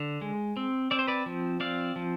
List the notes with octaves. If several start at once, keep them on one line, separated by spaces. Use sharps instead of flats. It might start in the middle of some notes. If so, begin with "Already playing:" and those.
Already playing: D3
G#3
C4
C4 D5
C5
B4 D5
F3
C4 D5 F5
F3